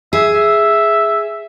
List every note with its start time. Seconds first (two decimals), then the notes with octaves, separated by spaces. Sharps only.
0.13 G#4 E5
0.34 E5